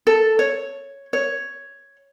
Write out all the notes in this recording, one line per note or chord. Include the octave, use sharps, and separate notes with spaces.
A4
C#5
C#5